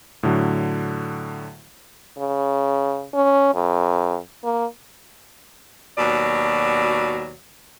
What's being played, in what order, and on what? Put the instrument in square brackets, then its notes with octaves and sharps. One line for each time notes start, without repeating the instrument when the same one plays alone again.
[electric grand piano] A2 D3 F#3
[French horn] C#3
C#4
F2
A#3
[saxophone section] D#2 B2 F#3 D5